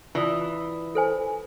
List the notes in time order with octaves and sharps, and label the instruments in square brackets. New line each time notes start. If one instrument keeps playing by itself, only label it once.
[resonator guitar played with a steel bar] E3 [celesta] F4 D5 D#6
[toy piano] A4 C5 G#5